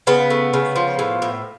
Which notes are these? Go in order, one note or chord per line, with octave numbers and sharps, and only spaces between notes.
C#3 B3
A3
C#3
F3
A2
A2